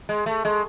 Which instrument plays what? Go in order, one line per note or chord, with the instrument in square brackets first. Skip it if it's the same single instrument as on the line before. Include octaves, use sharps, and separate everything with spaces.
[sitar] G#3
A3
G#3